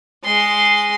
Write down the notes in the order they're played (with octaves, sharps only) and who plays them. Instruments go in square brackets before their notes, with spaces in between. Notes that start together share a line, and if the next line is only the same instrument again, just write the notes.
[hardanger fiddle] G#3 C6